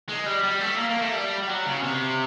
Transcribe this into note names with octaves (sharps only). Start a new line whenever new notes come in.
G#3
G3
G3
A3
A#3
A#3
A3
G3
G3
F#3
C#3
C3